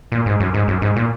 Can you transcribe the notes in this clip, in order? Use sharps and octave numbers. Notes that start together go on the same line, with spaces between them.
A#2
G#2
F#2
G#2
F#2
G#2
A#2